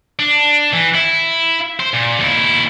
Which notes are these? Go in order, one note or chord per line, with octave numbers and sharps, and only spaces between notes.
D4
E3
E4
C5
A#2
D#2 E4